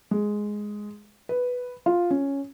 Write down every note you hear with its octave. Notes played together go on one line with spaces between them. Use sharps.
G#3
B4
F4
C#4